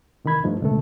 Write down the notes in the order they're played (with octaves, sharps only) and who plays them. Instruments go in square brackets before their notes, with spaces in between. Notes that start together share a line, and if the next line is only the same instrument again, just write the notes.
[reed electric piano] C3 D#3 E3 B5 G#6
G2 F3 A3 D#4
C#2 G#2 B2 D3 A3 A4